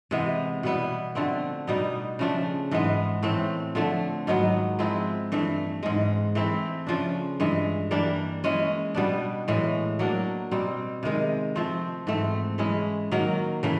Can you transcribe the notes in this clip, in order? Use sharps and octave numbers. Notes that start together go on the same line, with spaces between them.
C3 E3 G#3 B3
B2 G3 B3 E4
D3 F3 A3 C4
B2 G3 B3 D#4
C#3 F3 A3 D4
G#2 E3 G#3 B3
A2 E3 A3 C4
D3 F3 A3
G#2 D#3 F#3 B3
F3 G#3 C4 E4
G2 E3 A3
G#2 E3 G#3
E3 A3 C4 E4
C#3 F3 A3 D4
G2 E3 G#3
E3 G3 A#3 D4
E3 G#3 C#4
B2 G3 B3 D4
A2 E3 G#3
F#3 A#3 D4
B2 G3 C4
C3 D#3 G#3
F3 A3 C4
G#2 E3 A3 C4
E3 G#3 C#4 E4
D#3 F#3 A#3
C#3 E3 A3